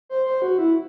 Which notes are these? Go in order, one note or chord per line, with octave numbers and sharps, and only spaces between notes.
C5
C5
F#4
E4